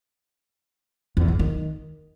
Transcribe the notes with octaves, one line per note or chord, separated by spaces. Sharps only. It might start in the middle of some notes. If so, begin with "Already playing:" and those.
E2
G#2
D#3